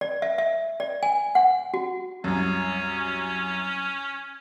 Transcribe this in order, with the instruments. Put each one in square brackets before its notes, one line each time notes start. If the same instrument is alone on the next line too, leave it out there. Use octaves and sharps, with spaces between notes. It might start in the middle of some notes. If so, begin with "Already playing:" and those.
[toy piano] D5
E5
E5
D5
G#5
F#5
F#4
[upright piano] C2 F#2 [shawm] C#4